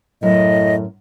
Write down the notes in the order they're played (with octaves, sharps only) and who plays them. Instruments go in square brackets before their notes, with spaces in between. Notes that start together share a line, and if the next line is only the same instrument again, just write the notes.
[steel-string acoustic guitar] F#2 [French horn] A2 [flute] D#5